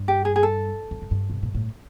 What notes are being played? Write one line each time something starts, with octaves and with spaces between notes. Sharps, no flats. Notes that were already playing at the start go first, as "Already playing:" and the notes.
Already playing: G2
G4
G#4
G#4
A4
F2
F#2
G2
B2
A#2
A2